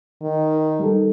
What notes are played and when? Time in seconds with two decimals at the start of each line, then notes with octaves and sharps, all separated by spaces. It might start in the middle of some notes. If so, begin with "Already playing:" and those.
0.22 D#3
0.80 G3 D#4 A4